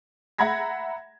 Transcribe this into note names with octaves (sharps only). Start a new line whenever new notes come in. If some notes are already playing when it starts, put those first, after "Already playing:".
E5 F#5 A#5 B5 G#6 A#6